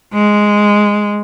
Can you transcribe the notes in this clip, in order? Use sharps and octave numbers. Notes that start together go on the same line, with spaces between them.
G#3